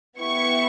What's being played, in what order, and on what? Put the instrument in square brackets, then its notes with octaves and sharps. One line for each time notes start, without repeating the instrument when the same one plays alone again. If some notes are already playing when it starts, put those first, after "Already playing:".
[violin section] B3 E4 G4 C#6